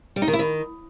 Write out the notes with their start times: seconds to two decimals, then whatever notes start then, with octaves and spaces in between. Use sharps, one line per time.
0.16 G3
0.22 D#4
0.28 D#3
0.33 E4
0.39 D#3